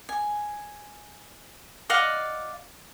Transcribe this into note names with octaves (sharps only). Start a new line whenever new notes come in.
G#5
D5 D#5 F5 F#5